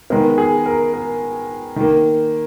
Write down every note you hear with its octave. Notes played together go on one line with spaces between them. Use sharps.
D#3 G#3 B3 A#4
G#4
A#4
A#4
D#3 A#3